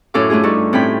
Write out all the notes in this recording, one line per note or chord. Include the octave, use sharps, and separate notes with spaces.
F#2 A2 C#4 A4 F5 D6
A3 D4 F4 G#4
G2 D4 D#4 A4 C#6
A2 C4 C#4 G5 B5